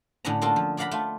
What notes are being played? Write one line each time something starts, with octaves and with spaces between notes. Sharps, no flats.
A2 D3 C#4 C#5 F#5 A#5
A#3 F4 F#4 A4
F3
C#5 D5 F5 F#5 A#5 B5
A3 F4